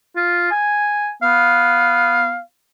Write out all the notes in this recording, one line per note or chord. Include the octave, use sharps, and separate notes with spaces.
F4
G#5
B3 F5